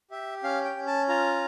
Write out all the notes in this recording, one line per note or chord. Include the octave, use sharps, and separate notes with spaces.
G4 E5
C#4 F5
G5
C#4
A5
F4 A#5